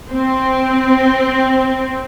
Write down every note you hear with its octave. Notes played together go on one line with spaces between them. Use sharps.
C4